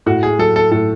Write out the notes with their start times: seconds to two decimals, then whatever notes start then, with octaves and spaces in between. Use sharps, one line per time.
0.06 A2 F#4
0.23 G#4
0.39 F#3 A4
0.56 A4
0.71 A2 A4